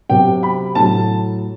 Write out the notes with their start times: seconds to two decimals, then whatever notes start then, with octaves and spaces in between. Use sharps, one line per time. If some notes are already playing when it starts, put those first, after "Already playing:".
0.09 C3 F#3 G5
0.43 B5
0.75 A2 F#3 A5